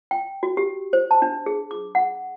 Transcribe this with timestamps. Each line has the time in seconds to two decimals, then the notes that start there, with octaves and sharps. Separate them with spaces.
0.11 G5
0.43 F#4
0.57 G4
0.93 C5
1.11 A5
1.22 D4
1.46 G#4
1.71 D6
1.95 F#5